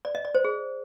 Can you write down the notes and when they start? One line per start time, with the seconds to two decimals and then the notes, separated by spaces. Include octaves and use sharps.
0.05 D5
0.15 D#5
0.25 D5
0.35 C5
0.45 G#4